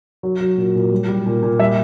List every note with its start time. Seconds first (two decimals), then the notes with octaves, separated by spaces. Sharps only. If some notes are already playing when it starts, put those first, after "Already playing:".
0.23 F#3
0.41 F#3
0.57 A#2
0.75 A#2
0.92 G3
1.08 G3
1.26 A#2
1.43 A#2
1.59 G3 E5